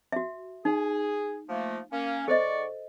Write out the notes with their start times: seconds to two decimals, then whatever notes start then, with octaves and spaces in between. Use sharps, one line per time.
0.12 F#4 E5
0.65 D#4 G#4
1.48 F3 A3 A#3
1.92 A#3 C#4
2.28 G#2 A4 C5 D5 D#5 C#6